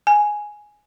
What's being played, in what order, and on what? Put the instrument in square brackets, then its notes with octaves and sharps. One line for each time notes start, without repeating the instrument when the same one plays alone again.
[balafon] G#5